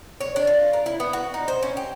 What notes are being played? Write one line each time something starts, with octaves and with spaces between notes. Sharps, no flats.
C#5
D4
F4
A#4
E4
B3
F#4
D#4
C5
C#4
G4